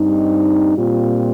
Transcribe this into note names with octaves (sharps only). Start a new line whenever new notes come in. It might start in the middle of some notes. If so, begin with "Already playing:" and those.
Already playing: G2 G3 C4 D#4
A#2 G3 C4 F4